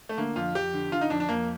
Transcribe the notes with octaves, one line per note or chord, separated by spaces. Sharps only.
A3
D3 A#3
F2 F4
F2 G4
D3
D3 F4
D#4
F2 D4
D4
F2 A#3